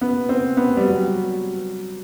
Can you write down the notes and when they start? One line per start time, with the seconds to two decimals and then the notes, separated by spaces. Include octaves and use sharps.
0.01 B3
0.29 C4
0.57 B3
0.77 G3
0.86 F#3